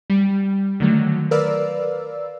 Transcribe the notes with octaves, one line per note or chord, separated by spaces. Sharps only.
G3
D3 D#3 F#3 A3
A#4 B4 D5 F5 E6